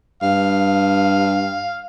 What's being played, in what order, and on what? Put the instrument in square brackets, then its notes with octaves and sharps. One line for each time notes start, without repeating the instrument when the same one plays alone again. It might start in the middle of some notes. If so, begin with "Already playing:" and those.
[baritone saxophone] G2 [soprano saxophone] F5